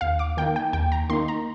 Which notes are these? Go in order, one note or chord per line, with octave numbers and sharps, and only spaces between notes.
D#2 F5
D6
D#3 A#3 D#4 G5
G5
D#2 G5
A#5
D#3 A#3 D#4 C6
A#5